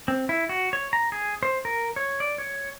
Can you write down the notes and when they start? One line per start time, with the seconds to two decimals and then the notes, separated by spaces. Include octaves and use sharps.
0.08 C4
0.29 E4
0.49 F#4
0.73 C#5
0.93 A#5
1.12 G#4
1.43 C5
1.65 A#4
1.96 C#5
2.20 D5
2.38 C#5